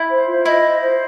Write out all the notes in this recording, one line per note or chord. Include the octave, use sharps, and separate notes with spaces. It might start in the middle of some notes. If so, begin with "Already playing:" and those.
Already playing: E4
C5
F4
E4 D#5
C5
C5